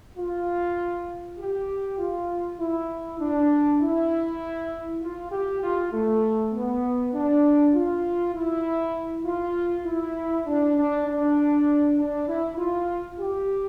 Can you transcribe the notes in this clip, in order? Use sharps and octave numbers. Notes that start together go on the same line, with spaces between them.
F4
G4
F4
E4
D4
E4
F4
G4
F4
A3
B3
D4
F4
E4
F4
E4
D4
D4
D4
D4
E4
F4
G4